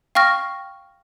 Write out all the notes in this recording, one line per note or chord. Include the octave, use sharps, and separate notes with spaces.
F5 G5 C#6 F6 A#6